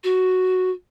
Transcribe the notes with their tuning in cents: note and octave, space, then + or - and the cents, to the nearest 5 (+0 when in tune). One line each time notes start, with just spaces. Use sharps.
F#4 +0